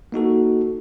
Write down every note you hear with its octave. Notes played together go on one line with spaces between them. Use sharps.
A#3 D#4 F#4 A4